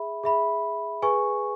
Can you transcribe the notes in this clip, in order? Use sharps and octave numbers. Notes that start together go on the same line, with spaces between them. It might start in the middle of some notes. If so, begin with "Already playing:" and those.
Already playing: G#4 E5 B5
G#4 E5 B5
G#4 B4 G#5 C#6